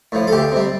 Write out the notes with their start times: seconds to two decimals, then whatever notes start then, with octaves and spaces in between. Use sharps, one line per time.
0.12 A2 F3
0.27 A4
0.32 D2 G4
0.52 C3 G3